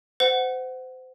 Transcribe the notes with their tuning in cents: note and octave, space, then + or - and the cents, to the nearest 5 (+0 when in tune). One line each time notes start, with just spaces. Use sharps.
C5 -30 F#5 +0